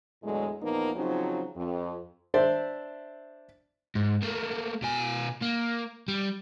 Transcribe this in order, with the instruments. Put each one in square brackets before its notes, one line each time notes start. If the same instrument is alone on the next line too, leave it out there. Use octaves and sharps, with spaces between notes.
[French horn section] E2 A2 D3 F#3 G#3
E2 A#2 F3 A#3 B3 D#4
C#3 F3 F#3 C4 D#4
F2
[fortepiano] D4 C5 D5 E5
[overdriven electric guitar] G#2
A3 A#3
B2 G#5
A#3
G3